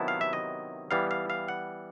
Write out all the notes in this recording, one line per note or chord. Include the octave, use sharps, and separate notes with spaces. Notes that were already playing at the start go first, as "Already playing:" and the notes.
Already playing: C3 D#3 F#3 B3 E4 A5
F5
E5
D#5
E3 G3 B3 F5
F5
F5
F#5